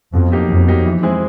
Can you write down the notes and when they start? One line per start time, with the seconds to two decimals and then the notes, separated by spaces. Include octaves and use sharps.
0.13 F2 B2
0.32 F#3 A#3 D#4 G4
0.49 F2 B2
0.68 F#3 A#3 D#4 G4
0.85 E3
1.03 G#3 C4 E4 G#4